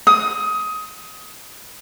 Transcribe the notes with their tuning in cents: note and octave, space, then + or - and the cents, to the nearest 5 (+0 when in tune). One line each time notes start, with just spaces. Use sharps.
D#6 +20